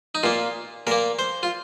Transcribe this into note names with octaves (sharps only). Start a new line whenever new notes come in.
D#4
A#2 A#3 F4
A#2 A#3 A#4
C5
F4